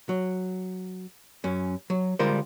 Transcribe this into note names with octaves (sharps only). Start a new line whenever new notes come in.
F#3
F#2 C#4
F#3
D3 G3 G#3 F4 A#4 C5